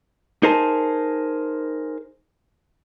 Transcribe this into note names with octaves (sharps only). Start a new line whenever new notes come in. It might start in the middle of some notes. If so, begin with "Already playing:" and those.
D#4 G#4 A#4 C5 G#5 A5